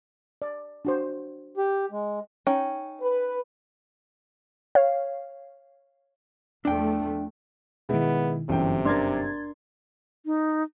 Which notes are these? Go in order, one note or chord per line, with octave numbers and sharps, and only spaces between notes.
D5
D4 F#4 C5
G4
G#3
C#4 D#4 G5
B4
C#5 F5
E2 F3 A3 D4 G5
B2 D#3 G#3 B3 E4
G1 F#2 C3 E3 G5
D4 A#4 C6 G#6 A6
D#4